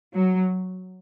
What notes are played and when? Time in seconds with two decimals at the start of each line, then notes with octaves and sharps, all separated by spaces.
0.15 F#3